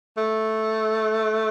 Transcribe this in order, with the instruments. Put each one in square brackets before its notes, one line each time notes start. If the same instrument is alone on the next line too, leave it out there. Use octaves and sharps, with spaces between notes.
[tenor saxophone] A3